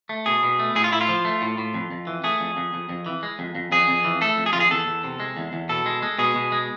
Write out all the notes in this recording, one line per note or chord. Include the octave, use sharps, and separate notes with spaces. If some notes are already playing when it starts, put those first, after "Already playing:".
A3
B2 G#4
B2
A3
A2 G#4
F4
A2 E4
F4
F3
A3
A2
A2
F2
F2
E3
A3 G#4
F2
F2
F2
F2
E3
G#3
F2
F2
F2 G#4
F2
E3
A3 A4
F2
G#4
F2 F4
G#4
E2 A4
E2
C3
G#3
E2
E2
B2 A4
G#3
G#3
B2 G#4
B2
G#3